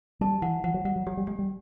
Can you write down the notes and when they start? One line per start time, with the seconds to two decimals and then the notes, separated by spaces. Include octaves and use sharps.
0.21 G3 A5
0.42 E3 F#5
0.64 F3 F#5
0.74 F#3
0.85 G3 F#5
0.96 F#3
1.07 F#3 G4
1.17 G3
1.27 G#3 G4
1.39 G3